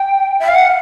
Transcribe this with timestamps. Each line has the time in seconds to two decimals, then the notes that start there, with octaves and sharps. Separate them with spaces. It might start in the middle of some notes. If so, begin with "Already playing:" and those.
Already playing: G5
0.39 E5
0.48 F5
0.55 F#5